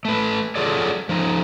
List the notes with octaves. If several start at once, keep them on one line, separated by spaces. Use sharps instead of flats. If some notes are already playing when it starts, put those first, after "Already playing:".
A3 B4
F#3 F4 G#4 A4 C#5 D5
F3 D#4